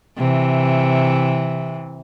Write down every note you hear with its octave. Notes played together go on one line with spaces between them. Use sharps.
C3 E3